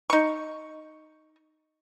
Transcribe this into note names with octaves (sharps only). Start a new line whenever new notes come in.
D#4 C#6